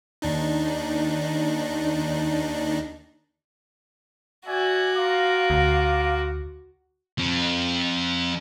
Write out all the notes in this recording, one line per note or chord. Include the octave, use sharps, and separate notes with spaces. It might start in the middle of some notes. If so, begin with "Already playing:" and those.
D#2 D4 D#4
F#4 D5 E5 G#5
F4 F5 A#5 D6
D2
F3 C4